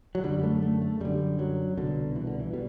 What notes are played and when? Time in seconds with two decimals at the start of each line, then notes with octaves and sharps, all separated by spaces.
0.15 F#3
0.24 F#2 D3 G3
0.43 A3
0.62 A3
0.81 A3
1.00 F#2 D3 G3
1.39 F#3
1.77 C2 B2 D3
2.16 E3
2.27 D3
2.40 E3
2.53 B2 G3